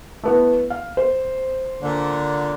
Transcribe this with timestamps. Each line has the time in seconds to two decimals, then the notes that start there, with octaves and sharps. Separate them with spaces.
0.24 A3 B3 E4
0.70 F5
0.97 C5
1.81 A#2 D3